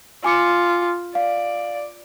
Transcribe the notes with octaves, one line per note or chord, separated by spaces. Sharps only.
F4 G#5 D6 C#7
D5 F5